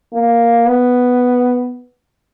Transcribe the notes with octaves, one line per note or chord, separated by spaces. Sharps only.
A#3
B3